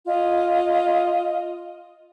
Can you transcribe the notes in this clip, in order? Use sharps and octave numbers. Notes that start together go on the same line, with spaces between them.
F4 D#5